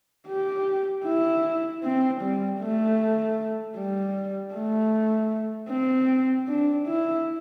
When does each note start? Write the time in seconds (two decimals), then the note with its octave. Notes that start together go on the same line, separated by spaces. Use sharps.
0.28 G4
1.05 E4
1.83 C4
2.22 G3
2.60 A3
3.77 G3
4.54 A3
5.70 C4
6.48 D4
6.87 E4